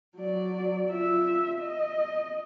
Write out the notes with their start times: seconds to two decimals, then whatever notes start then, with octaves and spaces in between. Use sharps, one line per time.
0.17 F#3 D5
0.88 F4 E5
1.61 D#5